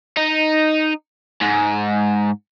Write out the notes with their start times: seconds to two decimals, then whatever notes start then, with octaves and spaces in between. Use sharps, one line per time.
0.17 D#4
1.41 G#2